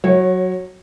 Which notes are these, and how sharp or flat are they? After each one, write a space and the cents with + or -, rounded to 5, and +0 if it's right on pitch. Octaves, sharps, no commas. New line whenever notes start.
F#3 +0 C#5 -20